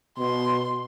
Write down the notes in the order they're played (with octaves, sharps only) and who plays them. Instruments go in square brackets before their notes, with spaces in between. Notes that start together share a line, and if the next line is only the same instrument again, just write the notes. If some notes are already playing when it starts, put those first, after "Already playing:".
[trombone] B2 [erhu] C6